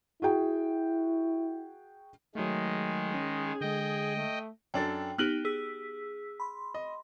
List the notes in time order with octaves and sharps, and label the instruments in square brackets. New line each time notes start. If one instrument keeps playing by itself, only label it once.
[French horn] E4 [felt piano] F#4 G#4 G5
[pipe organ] D#3 G#3 [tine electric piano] F#3 A3 [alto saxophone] G#4
[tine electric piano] C#4
[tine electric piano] D3 G#3 [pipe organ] D#5 G5
[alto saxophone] A3
[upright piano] F#2 D4 A4 [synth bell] G5
[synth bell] B3 D#4 G4 [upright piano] F6 F#6 F#7
[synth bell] G#4 E6 B6
B5 C6
[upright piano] D#5